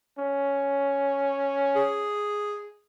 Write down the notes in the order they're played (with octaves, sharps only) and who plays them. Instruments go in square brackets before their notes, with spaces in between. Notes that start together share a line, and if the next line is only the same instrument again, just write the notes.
[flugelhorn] C#4
[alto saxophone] G#4